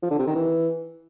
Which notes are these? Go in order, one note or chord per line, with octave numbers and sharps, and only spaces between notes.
F3
D3
C3
D#3
E3